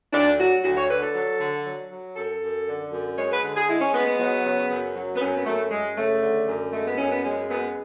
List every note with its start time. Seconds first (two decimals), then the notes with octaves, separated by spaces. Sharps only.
0.12 D2 D4
0.38 F#3 F#4
0.63 D2 F#4
0.76 C#5
0.89 D3 B4
1.02 A4
1.14 F#3
1.40 D3
1.66 F#3
1.90 F#3
2.16 F#2 A4
2.42 F#2
2.67 D3
2.92 F#2
3.18 G#3 C#5
3.31 B4
3.42 D3
3.55 G#4
3.68 G#3 E4
3.80 C#4
3.93 G#3 B3
4.06 B3
4.18 F#3
4.44 C#3
4.70 F#2
4.95 F#3
5.15 B3
5.20 F#2 C#4
5.36 B3
5.45 F#2 A3
5.70 F#2 G#3
5.96 C#3 A3
6.22 D3
6.47 F#2
6.73 G#3 A3
6.86 B3
6.98 F#2 C#4
7.11 B3
7.23 G#3 C#4
7.48 F#2 B3